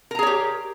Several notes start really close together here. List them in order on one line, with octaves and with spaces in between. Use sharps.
A#4 A#5 G#4 C#5 G4